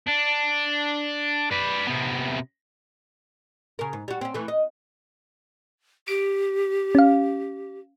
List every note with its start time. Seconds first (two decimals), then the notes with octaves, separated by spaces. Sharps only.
0.08 D4
1.51 B4 D5
1.87 C3 B3
3.79 C#3 A#4
3.93 G#2
4.08 G3 F#4
4.21 C4 C#4
4.34 E3 A3
4.48 D#5
6.08 G4 D7
6.95 C#4 F5